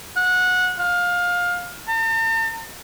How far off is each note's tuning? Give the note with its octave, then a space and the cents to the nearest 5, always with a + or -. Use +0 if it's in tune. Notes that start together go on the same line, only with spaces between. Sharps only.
F#5 -20
F5 +20
A5 +45